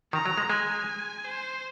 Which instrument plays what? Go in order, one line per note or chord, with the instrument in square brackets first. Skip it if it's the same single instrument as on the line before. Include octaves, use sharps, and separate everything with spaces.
[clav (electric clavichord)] D#3 [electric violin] A#5
[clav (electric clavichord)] F#3
G#3
[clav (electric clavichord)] G#3 [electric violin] G#5
[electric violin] C5